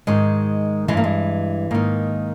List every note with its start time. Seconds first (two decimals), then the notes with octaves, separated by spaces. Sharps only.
0.07 G#2 D#3 G#3
0.88 E3 G#3
0.94 G2 A#3
1.04 G#3
1.71 G#2 D#3 A#3